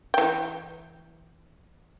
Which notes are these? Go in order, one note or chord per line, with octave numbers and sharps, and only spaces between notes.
E3 G5